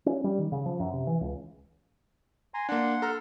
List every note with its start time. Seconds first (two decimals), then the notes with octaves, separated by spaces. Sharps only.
0.06 C#4
0.24 G3
0.39 D#3
0.52 C#3
0.66 F3
0.80 F#2
0.93 C3
1.07 E3
1.21 C#2
2.54 G#5 A#5 C6
2.69 A#3 D4 F#5 C6
3.02 A4 A#5 F6